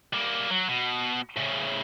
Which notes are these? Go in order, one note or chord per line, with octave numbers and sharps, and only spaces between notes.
G3 A#3
F#3
B2
A2 C#3